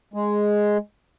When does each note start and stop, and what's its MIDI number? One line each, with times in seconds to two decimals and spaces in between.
0.14 0.77 56